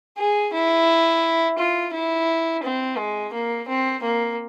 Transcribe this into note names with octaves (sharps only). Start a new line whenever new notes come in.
G#4
E4
F4
E4
C4
G#3
A#3
C4
A#3